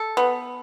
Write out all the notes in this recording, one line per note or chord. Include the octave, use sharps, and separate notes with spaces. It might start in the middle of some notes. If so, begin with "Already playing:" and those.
Already playing: A4
B3